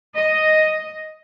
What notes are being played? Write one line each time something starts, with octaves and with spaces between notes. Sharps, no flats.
D#5